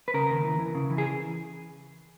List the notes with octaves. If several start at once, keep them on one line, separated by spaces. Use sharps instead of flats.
B4
C#3 A#4
D#2
E3
E3
C#3
E3
G#4